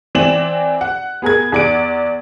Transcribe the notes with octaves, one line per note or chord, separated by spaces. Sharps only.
E3 C4 D5 E7 F#7
F#5
B3 G#4 A#4 G#6
E2 D5 D7